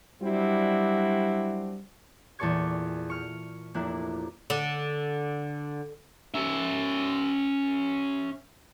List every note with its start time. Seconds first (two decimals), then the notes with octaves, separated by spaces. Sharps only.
0.22 F#3 G3 C4 D4 E4 F#4
2.39 E2 A#2 A4 D5 C#6 G#6
3.10 C#6 F6
3.74 F1 A#3 D4 E4 F#6
4.50 D3
6.34 C#4 E5